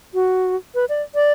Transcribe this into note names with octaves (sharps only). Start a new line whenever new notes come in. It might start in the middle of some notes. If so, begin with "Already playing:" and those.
F#4
B4
D5
D5